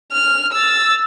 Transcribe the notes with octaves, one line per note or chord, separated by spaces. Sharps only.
F6
E6 A6